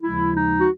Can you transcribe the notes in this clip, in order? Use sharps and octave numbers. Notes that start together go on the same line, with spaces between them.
D#2 C#3 F3 G#3 E4
D#4
F#4